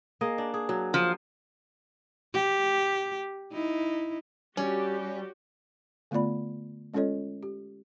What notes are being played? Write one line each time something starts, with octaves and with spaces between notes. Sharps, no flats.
A#3 G#4 D#5
D4
G#4
F#3
F3
G4
D#4 E4
G3 C#4 F#4 G4
D3 A3 B3 F4 D5 B5
G#3 C#4 F4 A4 C#5 D#5
G4